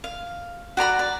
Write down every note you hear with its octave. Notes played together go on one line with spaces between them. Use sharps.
F5
F#4 D5 A#5 B5
D5